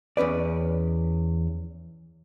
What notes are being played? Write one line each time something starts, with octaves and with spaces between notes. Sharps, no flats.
E2 C#4 B4 D5